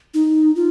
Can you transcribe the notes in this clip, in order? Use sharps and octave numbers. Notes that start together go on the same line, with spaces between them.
D#4
F4